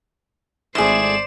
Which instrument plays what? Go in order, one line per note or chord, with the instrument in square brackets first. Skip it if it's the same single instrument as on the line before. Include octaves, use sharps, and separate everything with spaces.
[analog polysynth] G#1 E7 [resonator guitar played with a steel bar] A2 G#4 [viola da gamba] C5 D5